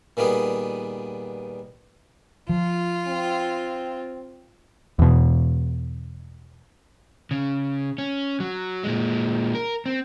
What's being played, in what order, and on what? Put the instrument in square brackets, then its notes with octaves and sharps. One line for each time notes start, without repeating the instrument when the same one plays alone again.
[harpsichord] A#2 D#3 G3 B3 G#4
[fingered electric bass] F3 [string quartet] F4
[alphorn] C4
[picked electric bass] E2 B2
[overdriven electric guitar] C#3
C#4
F#3
A#2 G#3
A#4
C4